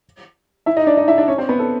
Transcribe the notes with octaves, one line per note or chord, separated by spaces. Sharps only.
E4 E5
D#4 D#5
D4 D5
D#4 D#5
E4 E5
D4 D5
C#4 C#5
C4 C5
B3 B4
A4